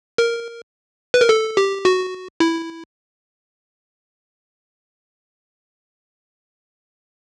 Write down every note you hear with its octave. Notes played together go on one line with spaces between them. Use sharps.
A#4
B4
A#4
A4
G4
F#4
E4